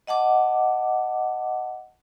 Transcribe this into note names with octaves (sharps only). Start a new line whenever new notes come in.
D#5 F#5 A5 D6